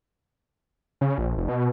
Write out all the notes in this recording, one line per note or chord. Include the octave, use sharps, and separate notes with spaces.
C#3
A#1
F1
B2